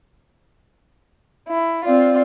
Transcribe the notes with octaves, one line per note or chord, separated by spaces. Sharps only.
E4
C4 F4 D5